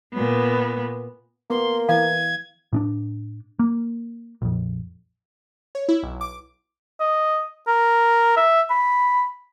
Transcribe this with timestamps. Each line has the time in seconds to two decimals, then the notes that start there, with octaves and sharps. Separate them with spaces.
0.14 A#2 B3
1.50 A#3 B3 C6
1.89 E3 F5 G#6
2.73 A2 C#4 D4
3.59 A#3
4.42 A#1 F2
5.75 C#5
5.88 E4
6.03 B1
6.21 D6
7.00 D#5
7.67 A#4
8.36 E5
8.70 B5